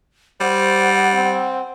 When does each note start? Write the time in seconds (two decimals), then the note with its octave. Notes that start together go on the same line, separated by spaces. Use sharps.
0.41 G3 C5 F#5
1.14 C4